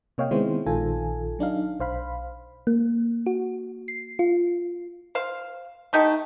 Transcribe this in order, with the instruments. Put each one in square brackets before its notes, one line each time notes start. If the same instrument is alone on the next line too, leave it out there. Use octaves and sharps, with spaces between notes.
[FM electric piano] C3 A#3 C#5 D#5 F5 G5
D#3 G#3 B3 C4 E4 C5
A#1 D#3 F4 A4 G#5
F#3 D4 D#4 F5
B1 C5 F5 B5
[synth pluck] A#3
F#4
C7
F4
[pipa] C5 F5
A3 D#4 G4 A4